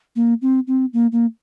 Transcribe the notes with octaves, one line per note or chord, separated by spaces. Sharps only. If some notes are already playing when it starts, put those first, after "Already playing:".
A#3
C4
C4
A#3
A#3